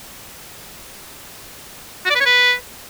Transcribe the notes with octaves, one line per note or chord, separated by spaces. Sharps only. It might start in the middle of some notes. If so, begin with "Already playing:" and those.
F#4
D5
B4
C#5
B4